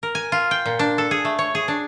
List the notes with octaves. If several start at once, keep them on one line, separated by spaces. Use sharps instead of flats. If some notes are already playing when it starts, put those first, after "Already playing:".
A#4
G#5
F4
G5
A#2
D4
A4
G#4
A3
C#5
G#4
D4